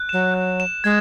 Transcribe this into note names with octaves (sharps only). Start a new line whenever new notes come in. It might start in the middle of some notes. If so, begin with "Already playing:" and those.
Already playing: F#6
F#3 E7
F#6
E7
G#3 G#6